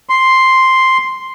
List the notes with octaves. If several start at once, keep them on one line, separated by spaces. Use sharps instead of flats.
C6